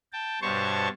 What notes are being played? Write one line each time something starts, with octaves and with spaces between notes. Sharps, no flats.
G5 A5
G2 B2 C5 C#5 A5 C#6